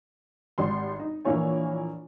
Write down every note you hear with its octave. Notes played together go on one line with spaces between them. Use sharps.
G#1 G3 C6
D#4
A#1 E3 A#3 E4 C#5 G#5